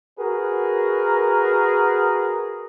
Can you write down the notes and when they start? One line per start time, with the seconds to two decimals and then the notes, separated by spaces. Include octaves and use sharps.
0.18 F#4 G#4 A#4 B4